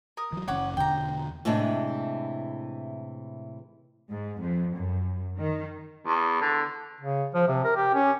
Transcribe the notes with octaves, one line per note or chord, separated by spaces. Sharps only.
A#4 D#6
E3 F#3
F#1 C#4 C#5 F#5 D6
E2 B2 D3 G5 A#5
A2 C3 E3 G#3 D4
G#2
F2
F#2
D#3
E2
D3
C#3
F3
C3
A#4
G4
C#4